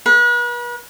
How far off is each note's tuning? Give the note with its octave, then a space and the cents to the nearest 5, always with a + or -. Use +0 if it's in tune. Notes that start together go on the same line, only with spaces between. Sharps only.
B4 -40